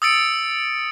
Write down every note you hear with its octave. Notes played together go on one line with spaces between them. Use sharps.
D#6 E6 A6 C#7 D7